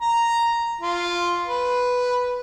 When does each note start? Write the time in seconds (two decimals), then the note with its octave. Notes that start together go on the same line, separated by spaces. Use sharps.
0.01 A#5
0.81 F4
1.47 B4